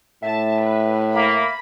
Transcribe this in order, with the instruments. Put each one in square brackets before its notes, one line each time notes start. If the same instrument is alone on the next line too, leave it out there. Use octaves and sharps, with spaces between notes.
[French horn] A2 [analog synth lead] E5 [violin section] A5
[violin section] B4
[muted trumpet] A#3 [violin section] B5